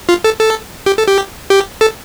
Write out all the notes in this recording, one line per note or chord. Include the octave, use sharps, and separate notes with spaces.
F4
A4
A4
G4
A4
G4
G4
A4